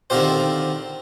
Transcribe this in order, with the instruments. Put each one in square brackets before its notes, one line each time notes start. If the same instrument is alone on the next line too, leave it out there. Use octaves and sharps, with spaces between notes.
[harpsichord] D3 D#3 C4 F4 G4 C5